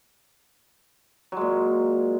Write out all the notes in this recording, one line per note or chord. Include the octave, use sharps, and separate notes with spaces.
A#2 F#3 G#3